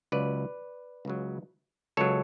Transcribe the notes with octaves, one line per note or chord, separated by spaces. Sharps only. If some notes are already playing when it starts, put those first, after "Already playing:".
C#2 C#3 F#3 B4 D5
C#2 C#3 F#3
C#2 C#3 F#3 A4 C#5